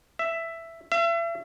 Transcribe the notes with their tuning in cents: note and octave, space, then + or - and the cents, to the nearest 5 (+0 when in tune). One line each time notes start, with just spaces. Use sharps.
E5 +10
E5 +40